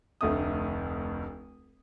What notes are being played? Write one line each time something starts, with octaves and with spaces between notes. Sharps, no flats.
F1 D2 A3 D#6